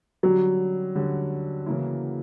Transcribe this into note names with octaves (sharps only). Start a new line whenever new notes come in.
D3 F#3 G3 C#4 G4
D3 G3 C#4 G4
C#3 E3 A#3 E4